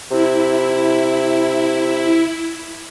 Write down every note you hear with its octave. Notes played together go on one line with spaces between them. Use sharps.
C3 E4